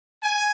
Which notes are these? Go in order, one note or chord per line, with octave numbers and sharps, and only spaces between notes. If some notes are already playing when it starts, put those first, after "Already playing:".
G#5